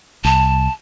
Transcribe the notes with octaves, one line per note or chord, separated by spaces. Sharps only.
C2 A5